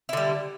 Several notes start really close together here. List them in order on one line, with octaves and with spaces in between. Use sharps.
E4 D3 G3